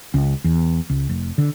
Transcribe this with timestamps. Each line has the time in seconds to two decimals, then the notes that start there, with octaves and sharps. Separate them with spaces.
0.14 C#2
0.44 E2
0.90 C#2
1.09 F1
1.38 D3